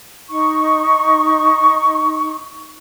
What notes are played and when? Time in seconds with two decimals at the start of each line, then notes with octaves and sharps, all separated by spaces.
0.29 D#4 C#6